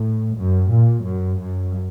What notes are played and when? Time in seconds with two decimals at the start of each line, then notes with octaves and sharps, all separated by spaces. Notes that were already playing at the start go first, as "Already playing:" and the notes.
Already playing: A2
0.36 F#2
0.69 A#2
1.03 F#2
1.37 F#2